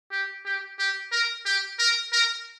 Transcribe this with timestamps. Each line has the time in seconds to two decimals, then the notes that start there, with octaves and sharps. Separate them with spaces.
0.12 G4
0.45 G4
0.79 G4
1.12 A#4
1.46 G4
1.79 A#4
2.13 A#4